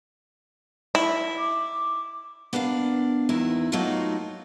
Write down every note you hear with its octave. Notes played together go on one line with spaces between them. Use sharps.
E4
D6
B3 D4 A#4 D5 F5
E2 D#3 B3 E4 A#4
F#3 A3 A#3 D#4 F4 F#4